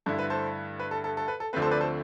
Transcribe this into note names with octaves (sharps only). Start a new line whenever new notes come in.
G2 D3 A3 E4 A4
B4
A4 C5
B4
A4
A4
A4
B4
A4
D2 D3 F3 A3 C4 B4
A4 C5
B4 D5
A4 C5